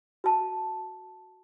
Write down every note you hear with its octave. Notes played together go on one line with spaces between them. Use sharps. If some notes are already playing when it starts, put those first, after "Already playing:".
F#4 A5